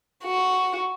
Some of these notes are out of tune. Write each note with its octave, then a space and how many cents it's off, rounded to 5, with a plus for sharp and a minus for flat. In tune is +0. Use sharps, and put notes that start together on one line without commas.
F#4 +0